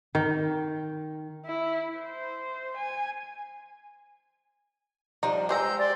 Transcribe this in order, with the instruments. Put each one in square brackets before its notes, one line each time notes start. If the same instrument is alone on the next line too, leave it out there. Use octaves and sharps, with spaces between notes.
[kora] D#3
[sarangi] E4
C5
G#5
[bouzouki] F3 G3 D4 [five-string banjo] D#4
[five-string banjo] G#3 C5 A#5 [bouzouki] G4 [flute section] E6 G6
[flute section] D5 C6